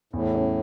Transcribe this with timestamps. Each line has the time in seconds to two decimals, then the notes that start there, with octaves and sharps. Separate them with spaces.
0.13 E2 A2
0.35 C#4